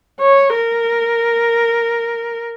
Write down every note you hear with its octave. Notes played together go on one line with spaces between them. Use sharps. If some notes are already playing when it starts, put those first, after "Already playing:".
C#5
A#4